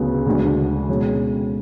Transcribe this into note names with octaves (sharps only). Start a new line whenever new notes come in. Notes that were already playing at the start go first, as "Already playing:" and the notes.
Already playing: D2 C#3 F#3 B3
D2 C#3 G#3 D4 F#4
B2 G#3 C#4 G#4